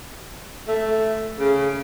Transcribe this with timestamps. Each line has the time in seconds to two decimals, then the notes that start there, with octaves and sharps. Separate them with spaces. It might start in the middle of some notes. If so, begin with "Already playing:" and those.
0.68 A3
1.40 C#3